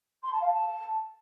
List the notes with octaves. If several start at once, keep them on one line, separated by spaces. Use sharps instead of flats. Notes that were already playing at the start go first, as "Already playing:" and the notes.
C6
A5
F5
A5